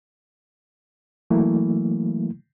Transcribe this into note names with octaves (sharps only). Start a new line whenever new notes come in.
E3 F#3 A3 A#3 E4